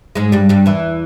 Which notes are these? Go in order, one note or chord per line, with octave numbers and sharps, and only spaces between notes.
G#2 G#3
G2 G3
G2 G3
E2 E3